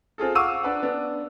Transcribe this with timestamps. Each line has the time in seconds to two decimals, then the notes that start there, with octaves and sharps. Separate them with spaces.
0.18 C4 F4 G#4 A4
0.35 F5 F#5 C#6 D6 E6 D#7
0.63 D4 B4 F#5
0.82 B3 D4